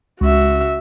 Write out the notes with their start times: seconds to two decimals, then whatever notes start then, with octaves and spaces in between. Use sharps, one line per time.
0.21 C#2 F#4 E5